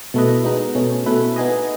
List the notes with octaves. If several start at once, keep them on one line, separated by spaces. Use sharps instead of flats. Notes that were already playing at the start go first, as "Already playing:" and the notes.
B2 A3 E4 B4 D#5
G#3 B3 D#4
B2 A3 C#4
B2 A3 E4 B4
B3 D#4 G#4 D#5